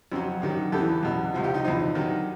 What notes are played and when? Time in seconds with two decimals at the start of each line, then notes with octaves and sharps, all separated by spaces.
0.12 F2 C#3 F#3
0.42 G2 D#3 F#3
0.72 E2 C#3 E3 G4 A4
1.03 E2 B2 F#3
1.34 C#2 C3 F3
1.44 F4 G4
1.54 D#4
1.64 E2 C3 F3 D#4
1.95 G2 D#3 F#3